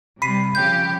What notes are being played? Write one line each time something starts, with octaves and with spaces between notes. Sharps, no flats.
C3 G3 B5 B6 C7 D#7
C#3 F3 G4 G6